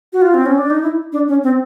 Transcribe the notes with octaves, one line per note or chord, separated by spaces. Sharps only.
F#4
F4
C4
C#4
D4
D#4
E4
D4
C#4
C4